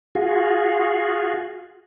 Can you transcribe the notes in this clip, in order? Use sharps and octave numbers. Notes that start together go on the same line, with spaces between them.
F4 F#4 G#4